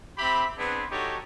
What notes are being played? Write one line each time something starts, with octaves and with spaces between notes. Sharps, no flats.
C4 G4 E5 B5
B3 C4 D4 G#4 B4
D4 D#4 F#4 G4 A4 C#5